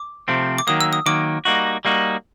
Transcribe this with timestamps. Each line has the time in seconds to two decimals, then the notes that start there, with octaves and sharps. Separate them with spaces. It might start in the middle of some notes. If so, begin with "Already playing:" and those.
Already playing: D6
0.28 C3 F3 A3 C4
0.58 D6
0.67 D#3 F#3 A#3 D#6
0.81 E6
0.93 D#6
1.06 D#3 F#3 A#3 D6
1.45 G3 A#3 D#4 F#4
1.85 G3 A#3 D#4 F#4